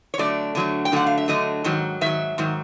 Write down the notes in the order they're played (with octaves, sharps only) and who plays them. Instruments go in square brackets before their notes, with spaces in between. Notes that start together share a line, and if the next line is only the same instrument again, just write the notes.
[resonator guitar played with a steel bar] C#5
D3 F#3 A3 D5
D3 F#3 A3
G5
D3 F#3 A3 F#5
F5
E5
D3 F#3 A3 D#5
G#2 D#3 F#3
G#2 D#3 F#3 E5
G#2 D#3 F#3